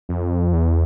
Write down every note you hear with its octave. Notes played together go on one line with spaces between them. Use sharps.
F2
E2